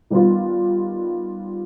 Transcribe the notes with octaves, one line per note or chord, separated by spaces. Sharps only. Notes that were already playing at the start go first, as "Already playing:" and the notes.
D#3 G3 B3 F4